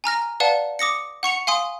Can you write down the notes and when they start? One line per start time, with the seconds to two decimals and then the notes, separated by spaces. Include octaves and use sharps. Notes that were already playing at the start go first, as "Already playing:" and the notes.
0.04 G#5 A#5 F6 A#6
0.40 B4 D5 F5 F#5 A5
0.79 D6 D#6 A#6 C#7
1.23 F#5 C#6 C#7 F7
1.47 F5 G#5 C6 D#6